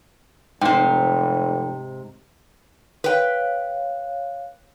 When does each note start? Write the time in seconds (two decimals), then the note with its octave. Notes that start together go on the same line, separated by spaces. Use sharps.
0.62 F1 G#2 C3 G5
3.04 B4 C#5 F5 G5